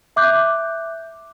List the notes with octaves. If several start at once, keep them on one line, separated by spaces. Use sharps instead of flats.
E5 D6 F#6 G6